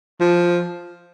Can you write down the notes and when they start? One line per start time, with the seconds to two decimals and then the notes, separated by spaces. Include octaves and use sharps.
0.20 F3